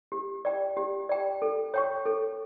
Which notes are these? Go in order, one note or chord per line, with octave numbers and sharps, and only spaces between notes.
G4
D5 G5
G4
D5 G5
A4
C#5 G5 C#6
A4